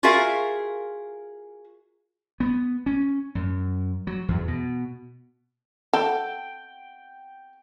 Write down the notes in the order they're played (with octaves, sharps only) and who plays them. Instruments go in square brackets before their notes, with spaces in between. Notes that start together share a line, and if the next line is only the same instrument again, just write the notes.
[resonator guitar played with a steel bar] F4 F#4 G#4 A#4 E5 F5
[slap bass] B3
C#4
F#2
F#3
E2
B2
[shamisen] A4 [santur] G5